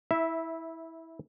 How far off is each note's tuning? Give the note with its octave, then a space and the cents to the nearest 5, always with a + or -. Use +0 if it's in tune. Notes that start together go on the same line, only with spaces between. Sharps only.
E4 -20 E5 +0